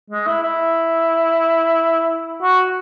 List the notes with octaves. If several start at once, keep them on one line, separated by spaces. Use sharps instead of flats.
G#3
E4
E4
F#4